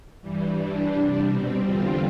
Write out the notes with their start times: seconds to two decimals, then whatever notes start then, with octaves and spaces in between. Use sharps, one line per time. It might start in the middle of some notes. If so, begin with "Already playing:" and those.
0.22 G2 E3 G3
0.57 G2 E3 G3 D4
0.93 C3 G3 D4
1.26 B2 G3 C4
1.62 E2 D3 G3 C4 F4